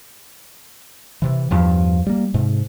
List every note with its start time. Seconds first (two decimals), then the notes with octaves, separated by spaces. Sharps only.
1.22 C3 E3
1.51 E2 G2 F3
2.06 G3 A#3
2.34 G#2 C3